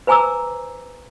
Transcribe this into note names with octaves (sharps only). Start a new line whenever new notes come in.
B4 C5 G#5 A#5 D6 E6